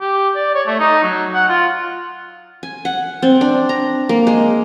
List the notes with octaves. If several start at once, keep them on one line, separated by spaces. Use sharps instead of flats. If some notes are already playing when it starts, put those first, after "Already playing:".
G4
D5
C#5
A3
D#4
F#3
F#5
F4
G#5
F#5
C4
D4
A#5
A#3
G#3